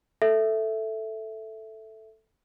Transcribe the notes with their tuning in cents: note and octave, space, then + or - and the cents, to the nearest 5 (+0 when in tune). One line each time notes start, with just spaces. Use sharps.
A4 +0 E5 +0